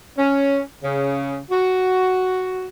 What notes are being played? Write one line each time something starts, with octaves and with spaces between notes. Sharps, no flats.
C#4
C#3
F#4